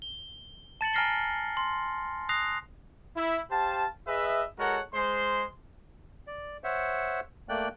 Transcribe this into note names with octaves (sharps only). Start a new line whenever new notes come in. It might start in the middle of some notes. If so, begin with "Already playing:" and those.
G7
A5 A6 C#7 F#7
G#5 A#5 F6 A#6 C7 G7
C6
D#6 F#6 A#6 C7 F7
E4
G4 C5 F5 A5
G#4 B4 D#5 E5
G#3 F#4 A4 A#4 C#5 F#5
G#3 C5 C6
D5
C5 C#5 E5 F#5
A3 A#3 D5 G5 F#6